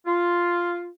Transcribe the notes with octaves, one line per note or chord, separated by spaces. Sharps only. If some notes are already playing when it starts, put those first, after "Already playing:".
F4